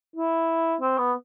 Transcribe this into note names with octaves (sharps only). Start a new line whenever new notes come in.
E4
C4
B3